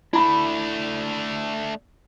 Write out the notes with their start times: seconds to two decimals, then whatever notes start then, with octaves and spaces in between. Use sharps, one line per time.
0.13 A3 D4 E4 A#5 B5